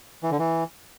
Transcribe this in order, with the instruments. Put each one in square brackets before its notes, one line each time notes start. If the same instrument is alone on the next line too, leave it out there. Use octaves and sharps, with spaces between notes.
[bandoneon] E3
D3
E3